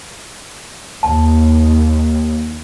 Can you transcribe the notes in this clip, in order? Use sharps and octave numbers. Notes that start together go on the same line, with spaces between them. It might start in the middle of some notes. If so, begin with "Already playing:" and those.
D#2 A5